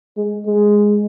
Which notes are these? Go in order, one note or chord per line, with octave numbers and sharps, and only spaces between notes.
G#3
G#3